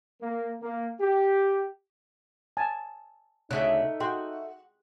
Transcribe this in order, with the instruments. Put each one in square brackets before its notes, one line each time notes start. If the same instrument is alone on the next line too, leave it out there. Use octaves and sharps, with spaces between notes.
[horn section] A#3
A#3
G4
[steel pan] G#5 A5
[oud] D2 C#3 [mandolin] A3 E5 F#6 [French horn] D#4
[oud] F#4 [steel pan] G#4 G5 C6